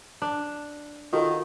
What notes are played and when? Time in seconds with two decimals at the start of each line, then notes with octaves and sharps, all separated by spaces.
0.22 D4
1.13 D#3 F4 F#4 A4